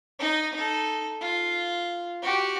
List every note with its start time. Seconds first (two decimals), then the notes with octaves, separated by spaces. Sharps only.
0.19 D#4 D#5
0.53 D#4 A4
1.21 F4
2.22 F#4 G4